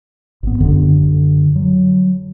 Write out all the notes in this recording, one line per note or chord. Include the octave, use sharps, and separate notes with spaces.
G#1 B3
F#2 D3
F#3